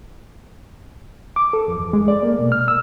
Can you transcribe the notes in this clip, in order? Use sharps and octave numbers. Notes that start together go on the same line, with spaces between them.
D6
A4
F2
E2
G#3
D5
A#3
B2
F6
E6